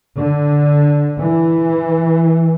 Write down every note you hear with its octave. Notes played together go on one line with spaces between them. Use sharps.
D3
E3